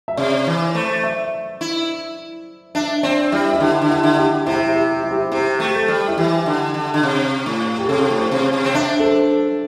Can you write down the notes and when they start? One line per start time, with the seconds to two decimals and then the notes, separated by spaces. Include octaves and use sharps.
0.08 E5
0.17 C3 D5
0.47 E3
0.75 A3 C5
1.04 E5
1.61 E4
2.75 D4 E5
3.03 C4 D5
3.32 G3 E4
3.52 E4
3.60 D3 G4
3.82 D3
3.90 E4
4.03 D3
4.17 G4
4.46 C3 E4
4.54 G4
4.63 E4
4.75 G4
5.03 E4
5.11 G4
5.17 E4
5.32 C3 G4
5.60 A3 G4
5.75 A4
5.88 G3
6.08 E4
6.17 E3 G4
6.46 D3
6.74 D3
6.94 D3
7.03 C3
7.46 A2
7.78 G4
7.88 C3 A4
8.10 A2
8.17 C5
8.31 C3
8.53 C3
8.64 C4
8.74 D4 E5
8.99 A4
9.04 C5
9.32 A4